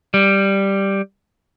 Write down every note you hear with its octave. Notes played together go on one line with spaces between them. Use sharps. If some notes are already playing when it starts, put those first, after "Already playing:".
G3